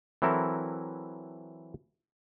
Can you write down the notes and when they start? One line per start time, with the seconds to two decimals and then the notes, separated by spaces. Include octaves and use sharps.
0.22 E3 F#3 C4 E4 A4 A#4